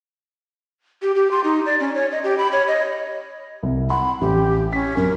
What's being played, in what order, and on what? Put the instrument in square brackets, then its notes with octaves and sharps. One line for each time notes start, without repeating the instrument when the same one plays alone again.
[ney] G4
G4
C6
D#4
D5
C#4
C#5
D#5
G4
B5
C#5
D#5
[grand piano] C2
[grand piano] F#5 C6 [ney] B5
[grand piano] A1 [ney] G4
[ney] C#4 [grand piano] B6
[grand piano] F#2 [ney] A#4